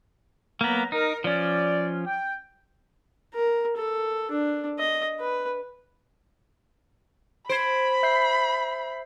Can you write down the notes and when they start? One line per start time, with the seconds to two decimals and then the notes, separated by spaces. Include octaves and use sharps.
0.61 F#3 A#3 B3 A#5
0.92 D#4 A#4
1.24 F3 C#4 D5
2.06 G5
3.35 A#4
3.77 A4
4.31 D4
4.79 D#5
5.20 B4
7.49 C5 B5 G#6 D7
8.03 E5 G6 C7